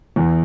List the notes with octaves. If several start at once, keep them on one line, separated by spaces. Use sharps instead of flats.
E2